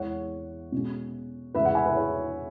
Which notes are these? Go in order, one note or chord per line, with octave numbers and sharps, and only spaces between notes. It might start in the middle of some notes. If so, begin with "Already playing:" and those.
Already playing: E2 E3 G#3 C#5 F#5
B2 G#3 C#4
E2 C#3 G#3 B4 E5
F#5 B5
E5 G#5
B4 E5
G#4 C#5